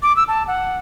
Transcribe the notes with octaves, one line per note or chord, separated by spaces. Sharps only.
D6
E6
A5
F#5